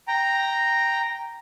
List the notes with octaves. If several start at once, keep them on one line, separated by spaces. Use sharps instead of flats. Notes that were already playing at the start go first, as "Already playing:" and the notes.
G5 A#5